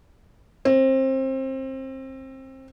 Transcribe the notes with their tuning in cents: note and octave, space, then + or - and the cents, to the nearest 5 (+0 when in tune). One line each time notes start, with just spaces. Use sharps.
C4 +25